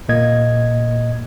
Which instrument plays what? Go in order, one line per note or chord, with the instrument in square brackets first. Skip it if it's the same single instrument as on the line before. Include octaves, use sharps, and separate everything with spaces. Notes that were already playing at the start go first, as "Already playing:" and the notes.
[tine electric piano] A#2 A#3 D#5 G#6